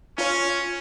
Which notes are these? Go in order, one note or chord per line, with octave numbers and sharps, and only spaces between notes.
C#4 F4 C#5